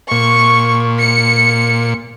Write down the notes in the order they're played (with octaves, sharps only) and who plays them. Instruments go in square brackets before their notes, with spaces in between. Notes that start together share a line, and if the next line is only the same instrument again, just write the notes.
[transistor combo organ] A#2 [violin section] C#6
[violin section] C#7